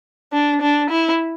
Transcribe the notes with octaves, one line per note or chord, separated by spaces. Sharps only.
D4
D4
E4